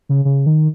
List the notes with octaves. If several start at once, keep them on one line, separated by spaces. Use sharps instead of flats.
C#3
C#3
D#3